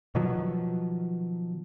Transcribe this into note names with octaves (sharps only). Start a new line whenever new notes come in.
B2 D#3 F3 F#3